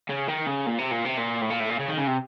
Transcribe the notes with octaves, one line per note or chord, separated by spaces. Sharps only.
C#3
D#3
C#3
A#2
C3
A#2
C3
A#2
A2
A#2
A2
A#2
C#3
D#3
C#3
C3